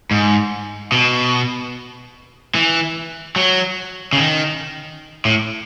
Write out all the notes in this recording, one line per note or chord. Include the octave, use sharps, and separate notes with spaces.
G#2
B2
E3
F#3
C#3
D#3
A2